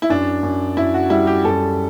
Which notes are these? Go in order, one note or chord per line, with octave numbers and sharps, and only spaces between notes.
E4
F#2 D4
F#2
F#2 E4
F#4
G3 E4
G4
F#2 A4